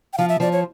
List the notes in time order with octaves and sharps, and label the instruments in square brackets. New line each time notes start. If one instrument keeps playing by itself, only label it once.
[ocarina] G5
[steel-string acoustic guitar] F3 [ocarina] F5
[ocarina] E5
[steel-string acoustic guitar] F3 [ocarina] D5
[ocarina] C#5